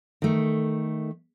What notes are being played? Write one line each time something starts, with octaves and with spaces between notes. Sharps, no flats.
D#3 A3